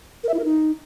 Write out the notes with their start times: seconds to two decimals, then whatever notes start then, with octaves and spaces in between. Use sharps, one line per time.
0.24 A#4
0.29 E5
0.34 E4
0.39 A#4
0.44 D#4